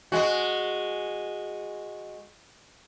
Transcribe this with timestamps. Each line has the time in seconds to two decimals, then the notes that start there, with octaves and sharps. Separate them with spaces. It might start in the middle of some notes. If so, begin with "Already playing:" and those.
0.12 G#3 F#4